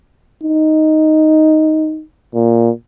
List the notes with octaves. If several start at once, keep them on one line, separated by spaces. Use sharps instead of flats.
D#4
A#2